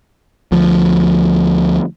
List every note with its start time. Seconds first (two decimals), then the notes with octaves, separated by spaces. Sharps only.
0.52 D2 F3